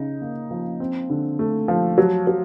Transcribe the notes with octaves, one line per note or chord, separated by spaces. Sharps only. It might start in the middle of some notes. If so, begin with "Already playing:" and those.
Already playing: C#3 D#4
A#3
F3
C4
D3
A3
F3
F#3
F#3